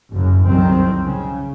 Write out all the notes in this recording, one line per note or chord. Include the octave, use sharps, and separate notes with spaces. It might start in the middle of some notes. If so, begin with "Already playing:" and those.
F#1 F#2
C2 F2 D#3 F#3 C4
C#3